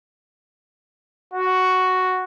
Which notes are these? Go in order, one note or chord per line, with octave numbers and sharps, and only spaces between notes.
F#4